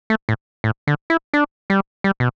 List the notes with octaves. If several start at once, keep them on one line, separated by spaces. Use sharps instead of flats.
A3
A2
A2
D3
E4
D4
G3
G3
B2